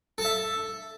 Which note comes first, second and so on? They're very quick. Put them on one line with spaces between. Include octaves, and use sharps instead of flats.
A4 A5 E5